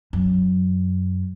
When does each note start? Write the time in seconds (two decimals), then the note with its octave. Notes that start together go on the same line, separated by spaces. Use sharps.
0.13 F#2